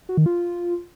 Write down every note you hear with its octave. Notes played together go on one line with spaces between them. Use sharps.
F#4
D#3
F4